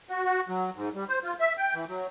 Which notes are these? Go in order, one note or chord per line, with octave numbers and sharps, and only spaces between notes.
F#4
F#4
F#3
G#2
G3
C5
F4
E5
G5
E3
F#3